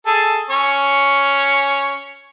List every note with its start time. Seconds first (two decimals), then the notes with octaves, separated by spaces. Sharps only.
0.07 G#4 A4
0.50 C#4 C#5